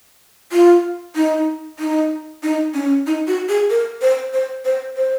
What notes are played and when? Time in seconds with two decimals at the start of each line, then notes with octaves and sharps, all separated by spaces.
0.52 F4
1.16 D#4
1.79 D#4
2.43 D#4
2.74 C#4
3.07 D#4
3.27 F#4
3.49 G#4
3.70 A#4
4.02 C5
4.33 C5
4.65 C5
4.97 C5